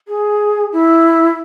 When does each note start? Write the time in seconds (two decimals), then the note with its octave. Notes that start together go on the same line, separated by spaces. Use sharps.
0.08 G#4
0.73 E4